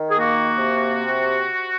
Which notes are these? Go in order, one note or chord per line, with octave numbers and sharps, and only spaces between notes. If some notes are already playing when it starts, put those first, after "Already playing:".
Already playing: D#3
G#4
A#3 F#4
C3